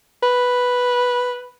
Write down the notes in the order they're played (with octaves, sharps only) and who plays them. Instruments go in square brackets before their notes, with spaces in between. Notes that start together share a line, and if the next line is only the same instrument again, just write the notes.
[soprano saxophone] B4